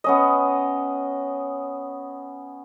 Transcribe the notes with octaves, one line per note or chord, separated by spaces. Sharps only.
B3 C#4 D#5